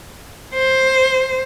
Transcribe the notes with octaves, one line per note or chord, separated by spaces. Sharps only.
C5